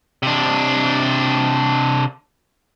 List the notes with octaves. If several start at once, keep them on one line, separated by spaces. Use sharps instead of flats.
C3 D4